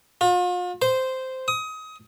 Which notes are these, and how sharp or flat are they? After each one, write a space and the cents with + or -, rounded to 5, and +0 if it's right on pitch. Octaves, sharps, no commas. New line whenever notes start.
F4 +40
C5 -10
D#6 +25